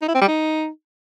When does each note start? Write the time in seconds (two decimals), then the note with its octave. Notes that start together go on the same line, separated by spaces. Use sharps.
0.02 D#4
0.08 E4
0.15 C4
0.21 G3
0.28 D#4